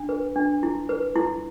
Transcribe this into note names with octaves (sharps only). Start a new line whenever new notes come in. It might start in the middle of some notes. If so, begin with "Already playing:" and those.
Already playing: D4
B4
D4
E4
B4
E4